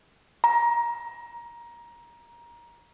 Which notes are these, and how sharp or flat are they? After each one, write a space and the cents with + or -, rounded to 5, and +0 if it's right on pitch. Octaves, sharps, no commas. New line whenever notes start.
A#5 +20